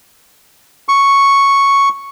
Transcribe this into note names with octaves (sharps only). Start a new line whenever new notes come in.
C#6